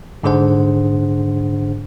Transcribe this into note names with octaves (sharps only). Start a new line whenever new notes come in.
G#2 D3 D4 G#4 C5 F#5